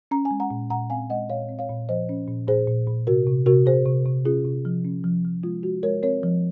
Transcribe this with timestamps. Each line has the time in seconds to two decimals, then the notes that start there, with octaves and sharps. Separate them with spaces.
0.11 C#4 A#5
0.25 G#5
0.31 G#3
0.40 F#5 A#5
0.50 A#2
0.70 A#2 F#5 A#5
0.90 C4 F5 G#5
1.10 G#3 D#5 F#5
1.30 A#2 C#5 F5
1.49 C4
1.59 C#5 F5
1.69 A#2
1.89 F3 C5 D#5
2.09 C#4
2.28 A#2
2.48 A#2 G#4 C5
2.68 A#2
2.87 A#2
3.07 C3 F#4 A#4
3.27 C3
3.46 C3 F#4 A#4
3.66 C3 G#4 C5
3.86 C3
4.06 C3
4.25 C#4 F4 G#4
4.45 C3
4.65 F3
4.85 C#4
5.04 F3
5.24 F3
5.43 G#3 F4
5.63 G#3 F#4
5.83 G#3 A#4 C#5
6.03 C4 A#4 C#5
6.23 F3